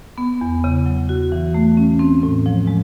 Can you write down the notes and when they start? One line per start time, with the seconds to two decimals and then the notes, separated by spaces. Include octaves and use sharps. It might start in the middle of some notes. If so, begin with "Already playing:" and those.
0.18 B3
0.41 E2
0.64 C#3
0.86 F#3
1.09 F#4
1.32 E3
1.54 A3
1.77 C#4
1.99 C4
2.23 A2
2.46 F3
2.67 G#3